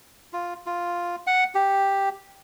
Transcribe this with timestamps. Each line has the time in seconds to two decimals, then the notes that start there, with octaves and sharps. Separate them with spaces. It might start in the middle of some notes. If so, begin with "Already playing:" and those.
0.33 F4
0.66 F4
1.27 F#5
1.55 G4